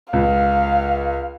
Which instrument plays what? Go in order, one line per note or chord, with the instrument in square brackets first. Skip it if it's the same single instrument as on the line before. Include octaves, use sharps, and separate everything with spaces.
[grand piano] C#2 [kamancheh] F5